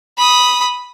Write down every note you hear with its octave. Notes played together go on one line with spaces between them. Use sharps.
B5 D#6